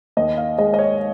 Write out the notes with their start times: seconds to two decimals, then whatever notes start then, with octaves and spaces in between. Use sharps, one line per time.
0.17 D#2 D#5
0.37 F5
0.58 G#3 D#5
0.74 D#5
0.79 C#5